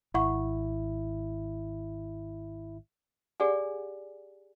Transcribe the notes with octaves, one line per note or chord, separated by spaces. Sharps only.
G#1 E4 E5 F#5 C#6
G4 G#4 D5 F#5 G#5